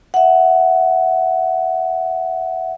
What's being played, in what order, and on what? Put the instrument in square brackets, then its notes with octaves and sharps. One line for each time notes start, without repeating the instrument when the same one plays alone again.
[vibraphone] E5 F#5